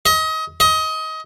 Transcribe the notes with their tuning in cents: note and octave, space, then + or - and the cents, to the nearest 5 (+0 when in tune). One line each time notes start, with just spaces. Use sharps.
D#5 +30
D#5 +25